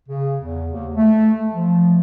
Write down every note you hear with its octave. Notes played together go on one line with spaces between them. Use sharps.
C#3
E2
D#2
A3
F3